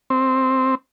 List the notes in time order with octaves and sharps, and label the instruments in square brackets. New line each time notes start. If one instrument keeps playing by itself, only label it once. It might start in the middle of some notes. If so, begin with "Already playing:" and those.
[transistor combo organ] C4